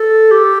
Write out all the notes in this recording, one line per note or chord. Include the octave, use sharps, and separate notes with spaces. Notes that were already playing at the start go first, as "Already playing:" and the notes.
Already playing: A4
G4